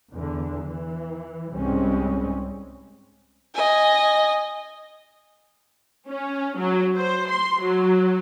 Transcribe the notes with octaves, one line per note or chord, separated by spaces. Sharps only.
E2 D3
E3
C2 G#2 G3 G#3 C4 C#4
D#5 G#5
C#4
F#3
C5
C6
F#3